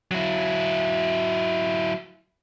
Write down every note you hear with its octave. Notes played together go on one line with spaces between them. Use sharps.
F#3 E4